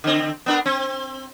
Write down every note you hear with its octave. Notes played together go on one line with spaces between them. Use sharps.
D3 C4
B3 D4 A#4
C4